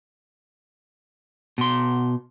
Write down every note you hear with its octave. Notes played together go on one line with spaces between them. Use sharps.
B2 C6